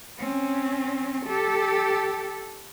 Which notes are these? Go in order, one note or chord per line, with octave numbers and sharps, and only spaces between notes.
C4 C#4
G4 A4